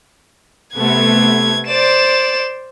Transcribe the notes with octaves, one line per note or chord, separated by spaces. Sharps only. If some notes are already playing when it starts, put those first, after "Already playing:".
C3 A3 B3 G#6
C5 D5 E7